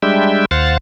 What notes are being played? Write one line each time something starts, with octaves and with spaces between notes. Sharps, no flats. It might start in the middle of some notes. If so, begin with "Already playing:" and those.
G3 G#3 D4 E5 G5
D#2 C5 F5 F#5 A6